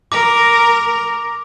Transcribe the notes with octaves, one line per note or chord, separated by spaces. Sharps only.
A#4 D6